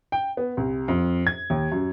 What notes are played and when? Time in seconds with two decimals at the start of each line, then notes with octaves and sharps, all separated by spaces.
0.12 G5
0.37 B3
0.57 C2
0.88 F2
1.27 G#6
1.50 D#2
1.72 F#2